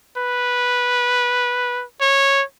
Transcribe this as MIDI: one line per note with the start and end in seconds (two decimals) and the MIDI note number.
0.18 1.83 71
2.01 2.43 73